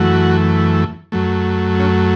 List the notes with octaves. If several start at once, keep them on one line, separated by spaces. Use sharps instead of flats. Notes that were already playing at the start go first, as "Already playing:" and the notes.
Already playing: F#2 E3 A3 F#4
F#2 F#3 A3
C#4